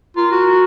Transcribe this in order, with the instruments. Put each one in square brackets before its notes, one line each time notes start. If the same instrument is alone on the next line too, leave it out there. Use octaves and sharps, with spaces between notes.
[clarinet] F4 [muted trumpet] A#4
[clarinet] F#4